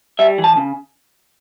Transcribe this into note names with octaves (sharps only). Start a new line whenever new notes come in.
G3 E5
E3
A5
C#3